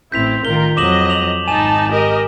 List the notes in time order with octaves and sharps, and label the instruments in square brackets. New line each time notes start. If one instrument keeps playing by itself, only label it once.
[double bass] A1 [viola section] C4 E4 [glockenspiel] G6 B6 F7
[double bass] A1 D#3 [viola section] F4 A#4 [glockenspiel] G7
[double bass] F2 F#3 [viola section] D#5 [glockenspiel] D6 E7 F#7
[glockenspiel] F7 F#7
[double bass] G#1 [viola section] D#4 A5 [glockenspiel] G#5 E7
[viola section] G4 A#4 D#5